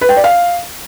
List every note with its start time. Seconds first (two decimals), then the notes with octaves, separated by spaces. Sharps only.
0.01 B4
0.09 G5
0.16 D5
0.24 F5